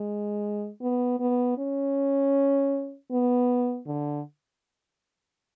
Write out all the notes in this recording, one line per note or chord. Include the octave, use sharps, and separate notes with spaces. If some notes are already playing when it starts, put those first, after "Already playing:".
Already playing: G#3
B3
B3
C#4
B3
D3